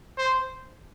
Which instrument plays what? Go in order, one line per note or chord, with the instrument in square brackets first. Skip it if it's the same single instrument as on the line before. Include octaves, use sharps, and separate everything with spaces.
[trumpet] C5